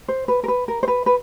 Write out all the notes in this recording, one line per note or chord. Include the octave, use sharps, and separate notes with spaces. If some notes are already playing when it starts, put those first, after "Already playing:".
C5
B4
A#4
B4
A#4
C5
B4
B4